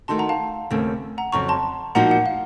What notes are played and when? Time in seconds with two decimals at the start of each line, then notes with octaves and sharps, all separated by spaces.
0.08 D#3 A3 D#4 F#4 A5 C6
0.18 F#5 A#5
0.29 F5 A5
0.70 D#2 C#3 A3 C4
1.18 F#5 A#5
1.32 F2 C#3 F#3 A#5 C#6
1.48 A5 C6
1.95 A#2 F3 A#3 D#4 F#4 F#5 A#5
2.11 F#5
2.26 F5